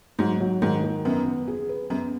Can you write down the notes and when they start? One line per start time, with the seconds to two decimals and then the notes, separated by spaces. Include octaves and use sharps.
0.19 G#2 F#3
0.40 F#3
0.62 G#2 D#3
0.84 D#3
1.05 F#2 B3
1.26 B3
1.48 G#4
1.69 B4
1.90 F#2 B3